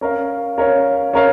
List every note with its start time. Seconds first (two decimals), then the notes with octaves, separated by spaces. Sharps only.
0.01 C#4 A#4 C#5 F5
0.58 C#4 A#4 C#5 F5
1.14 C#4 A#4 C#5 F5